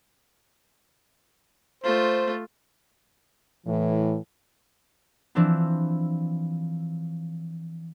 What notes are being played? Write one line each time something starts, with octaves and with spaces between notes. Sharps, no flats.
A3 F4 C5
A2 E3
E3 F3 C4 D4 E4